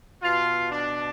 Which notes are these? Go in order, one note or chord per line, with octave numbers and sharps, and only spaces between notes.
B2 F4
D4